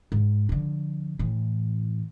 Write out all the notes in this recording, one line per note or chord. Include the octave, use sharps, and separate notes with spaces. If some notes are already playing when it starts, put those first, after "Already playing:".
G#2
D3 F3
A2 E3